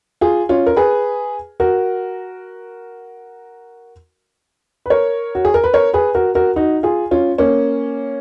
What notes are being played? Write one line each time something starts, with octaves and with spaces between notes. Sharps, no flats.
F4 G#4
C#4 F4
A#4
G#4 B4
F#4 A#4
B4
A#4 C#5
F#4
G#4
A#4
B4
A#4 C#5
G#4 B4
F#4 A#4
F#4 A#4
D#4 F#4
F4 G#4
C#4 F4
A#3 C#4